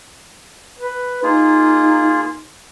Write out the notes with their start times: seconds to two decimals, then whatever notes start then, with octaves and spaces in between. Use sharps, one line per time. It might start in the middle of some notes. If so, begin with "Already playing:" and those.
0.79 B4
1.23 A#3 D#4 F4 G#4